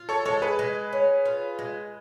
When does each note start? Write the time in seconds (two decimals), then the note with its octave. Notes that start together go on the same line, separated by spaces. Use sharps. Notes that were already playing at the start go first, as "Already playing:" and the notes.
Already playing: F4
0.09 A4 C#5
0.25 G#3 A4 C#5
0.42 G#4 B4
0.59 G#3
0.93 C#4
1.25 F4
1.59 G#3